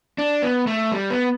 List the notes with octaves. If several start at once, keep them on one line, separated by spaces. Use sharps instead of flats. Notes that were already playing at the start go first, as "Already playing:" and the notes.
D4
B3
A3
G3
B3